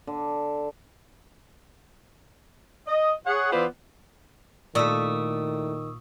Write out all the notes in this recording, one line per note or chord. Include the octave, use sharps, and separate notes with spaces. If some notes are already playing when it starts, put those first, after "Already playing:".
D3
D#5
G#4 C#5 F#5
E3 B3 F4 B4 C5 D5
A#2 D#3 A3 E4 D5 C#6 D#6 E6